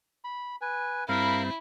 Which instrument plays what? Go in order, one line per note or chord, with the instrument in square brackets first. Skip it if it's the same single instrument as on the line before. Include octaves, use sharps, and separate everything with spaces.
[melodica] B5
B4 G#5
[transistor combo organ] G2 C4 [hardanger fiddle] E4 [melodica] A#4 F5 B5